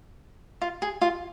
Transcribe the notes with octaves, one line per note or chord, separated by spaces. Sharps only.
F4
G#4
F4